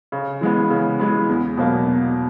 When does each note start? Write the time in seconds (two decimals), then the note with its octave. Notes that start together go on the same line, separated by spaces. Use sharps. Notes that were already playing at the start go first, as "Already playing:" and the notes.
0.12 C#3
0.41 E3 G#3 B3
0.70 C#3
0.99 E3 G#3 B3
1.29 E2
1.57 B2 F#3 A#3
1.86 E2